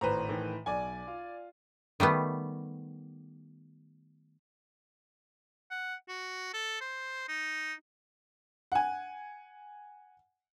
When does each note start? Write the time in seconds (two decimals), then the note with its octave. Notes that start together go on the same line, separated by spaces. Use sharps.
0.01 G#1 A2 B4 C5 A#5
0.29 A2 D#3 E3
0.66 B1 D5 G#5
1.07 F4
2.00 D#3 G3 A3 B3
5.71 F#5
6.08 F#4
6.54 A4
6.81 C5
7.28 D#4
8.72 F#5 G#5